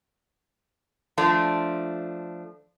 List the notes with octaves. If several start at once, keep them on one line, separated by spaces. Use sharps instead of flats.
F3 A3 D4